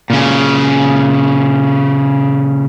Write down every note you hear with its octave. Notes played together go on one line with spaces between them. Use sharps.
A#2 C#3